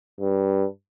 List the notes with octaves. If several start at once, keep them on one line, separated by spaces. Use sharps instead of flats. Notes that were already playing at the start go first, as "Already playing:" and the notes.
G2